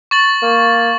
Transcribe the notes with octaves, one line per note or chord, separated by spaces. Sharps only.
C#6 A6 F#7
A#3